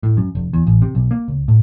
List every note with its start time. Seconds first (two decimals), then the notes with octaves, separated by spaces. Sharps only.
0.03 A2
0.17 F#2
0.35 F1
0.53 E2
0.67 A1
0.82 C3
0.95 B1
1.11 A#3
1.28 C#2
1.48 A2